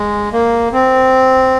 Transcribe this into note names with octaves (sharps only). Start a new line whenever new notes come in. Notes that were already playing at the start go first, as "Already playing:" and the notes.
Already playing: G#3
A#3
C4